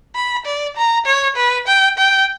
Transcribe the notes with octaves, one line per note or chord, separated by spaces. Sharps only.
B5
D5
A#5
C#5
B4
G5
G5